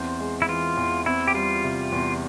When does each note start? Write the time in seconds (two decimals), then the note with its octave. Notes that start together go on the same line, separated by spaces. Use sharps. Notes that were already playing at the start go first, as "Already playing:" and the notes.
Already playing: E2 C4 C5
0.20 G#3
0.42 E4
0.49 E3 F4
0.77 E2
1.06 C4 E4
1.28 G4
1.34 G3 F4
1.64 C3
1.92 E2